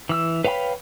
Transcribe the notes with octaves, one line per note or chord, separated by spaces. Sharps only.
E3 E6
B4 C#5 F5 G5 B5